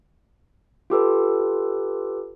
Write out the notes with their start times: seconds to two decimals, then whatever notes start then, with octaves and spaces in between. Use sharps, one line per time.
0.90 F4 G4 A4 B4